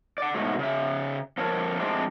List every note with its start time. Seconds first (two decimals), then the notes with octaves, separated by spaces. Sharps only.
0.18 D5 F#5
0.34 G#2 B2 F#3 A3
0.59 C#3 E5
1.38 F3 A#3 A4 A#4 C#5
1.79 F3 G#3 A3 C4 D4